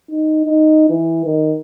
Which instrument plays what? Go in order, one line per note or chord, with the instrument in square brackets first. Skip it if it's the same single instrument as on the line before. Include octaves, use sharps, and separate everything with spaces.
[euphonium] D#4
D#4
E3
D#3